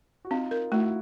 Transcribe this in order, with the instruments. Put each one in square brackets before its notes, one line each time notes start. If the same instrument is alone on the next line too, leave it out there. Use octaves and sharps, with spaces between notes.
[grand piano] F#4
[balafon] C4 [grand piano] D#4 F4
[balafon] A#4
[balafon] A3 [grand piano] E4 F#4